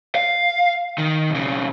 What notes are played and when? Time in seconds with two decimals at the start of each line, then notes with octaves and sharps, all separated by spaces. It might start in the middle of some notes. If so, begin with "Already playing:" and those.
0.15 F5
0.98 D#3
1.30 B1 C#3